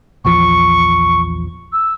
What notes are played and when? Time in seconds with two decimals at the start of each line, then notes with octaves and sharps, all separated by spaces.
0.25 A#1 E2 F3 C#6
1.73 E6